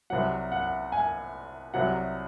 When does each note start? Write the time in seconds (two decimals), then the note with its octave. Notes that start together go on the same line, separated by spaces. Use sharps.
0.10 C2 C3 F#3 F#5
0.52 F#5
0.92 G#5
1.74 C2 C3 F#3 F#5